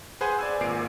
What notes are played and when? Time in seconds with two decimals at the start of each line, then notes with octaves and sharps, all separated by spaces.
0.21 G#4 B4 C5 F#5 G#5 C6
0.39 D5 G#5 E6
0.60 G#1 A#2 C7 D7